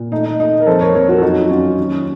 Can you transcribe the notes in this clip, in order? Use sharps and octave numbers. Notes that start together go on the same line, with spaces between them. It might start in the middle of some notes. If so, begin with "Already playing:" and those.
Already playing: A#2
A3 D#4
D#4
A3 D#4
A#4
F2 A4 C5
A#4 C#5
F2 A#4 C#5
F#4 A#4
A4
F#2 D#4 F#4
F#4
F#2 C#4 F4
D#2 C#4